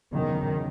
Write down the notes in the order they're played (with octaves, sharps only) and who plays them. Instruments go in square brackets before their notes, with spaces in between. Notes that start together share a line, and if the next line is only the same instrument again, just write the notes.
[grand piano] F#1 E2 B2 [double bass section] D#3